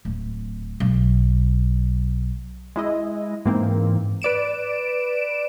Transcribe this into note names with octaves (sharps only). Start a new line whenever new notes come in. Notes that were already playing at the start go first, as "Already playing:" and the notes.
D1
B1
G#3 E4 D#5
G#2 E3 A#3 C4
B4 D5 D7 E7